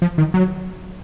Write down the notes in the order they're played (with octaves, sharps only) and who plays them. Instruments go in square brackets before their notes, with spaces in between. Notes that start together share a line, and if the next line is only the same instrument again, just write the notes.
[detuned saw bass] F3
D#3
F#3